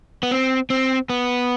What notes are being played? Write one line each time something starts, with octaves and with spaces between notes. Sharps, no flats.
B3
C4
C4
B3